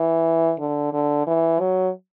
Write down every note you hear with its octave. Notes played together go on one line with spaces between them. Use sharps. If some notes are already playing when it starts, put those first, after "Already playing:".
Already playing: E3
D3
D3
E3
F#3